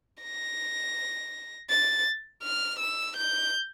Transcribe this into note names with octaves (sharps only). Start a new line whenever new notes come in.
A#6
A6
F6
E6
G6